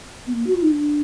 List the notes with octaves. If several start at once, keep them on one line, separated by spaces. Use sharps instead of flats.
B3
A#3
F#4
F4
D#4
D4